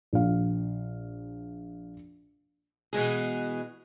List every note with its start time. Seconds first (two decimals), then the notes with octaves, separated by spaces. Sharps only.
0.13 A#1 F5
2.93 B2 E3 G#3 G#4